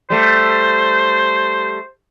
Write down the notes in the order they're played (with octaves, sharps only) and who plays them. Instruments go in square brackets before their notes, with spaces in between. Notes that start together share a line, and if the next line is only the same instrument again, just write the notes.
[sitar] G3 A3 [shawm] C5